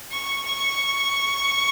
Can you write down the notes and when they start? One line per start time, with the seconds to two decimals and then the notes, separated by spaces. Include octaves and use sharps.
0.12 C#6
0.47 C#6